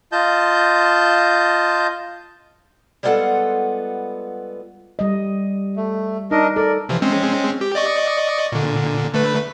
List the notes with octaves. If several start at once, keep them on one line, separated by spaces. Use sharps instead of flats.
F4 D#5 A5 G6
G3 G#3 B3 F4 A4 F#5
G3 D#5
A3
D4 D#4 A#4 D#5
A4 A#4 D5
C3 E3 F3
G#3 C4 C#4
G4
D5 D#5 C#6
A#2 D3
D3 A3 B4